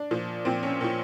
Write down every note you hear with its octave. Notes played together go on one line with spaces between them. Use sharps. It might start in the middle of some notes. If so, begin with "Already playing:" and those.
Already playing: D4
A#2 F3
A#2 F3 C4
C#4
A#2 F3